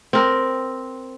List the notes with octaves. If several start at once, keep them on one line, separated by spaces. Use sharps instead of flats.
C4 A#4